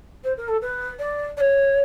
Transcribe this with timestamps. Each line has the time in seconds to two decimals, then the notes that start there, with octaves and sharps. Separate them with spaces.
0.24 C5
0.37 A#4
0.48 A4
0.62 B4
0.99 D5
1.37 D5
1.40 C#5